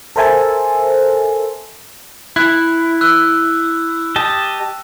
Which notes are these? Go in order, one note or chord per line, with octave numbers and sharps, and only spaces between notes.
A4 A#4 C5 E5 G#5 A5
E4 F#6
E6 F#6
G4 D#5 A5